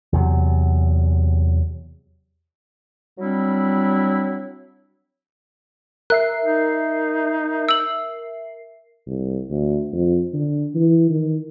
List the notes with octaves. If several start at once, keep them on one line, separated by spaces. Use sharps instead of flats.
E2 C3 F#3
F#3 G3 C4 D4 E4
A#4 E5 F#6 C7
D#4
E6 F#7
C2
D2
F2
D3
E3
D#3